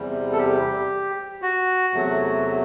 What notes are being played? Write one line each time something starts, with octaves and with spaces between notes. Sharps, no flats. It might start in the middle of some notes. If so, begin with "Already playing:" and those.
Already playing: E2 C3 G3
A4
G4
F#4
E2 C3 F#3 A3